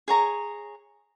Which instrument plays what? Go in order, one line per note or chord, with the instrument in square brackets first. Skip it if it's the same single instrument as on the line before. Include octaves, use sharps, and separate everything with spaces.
[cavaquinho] G#4 C#5 A#5